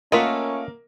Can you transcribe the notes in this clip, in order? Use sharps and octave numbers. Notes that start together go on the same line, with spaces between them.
A3 A#3 C#4 F4 A#4 D#5 E5 F#5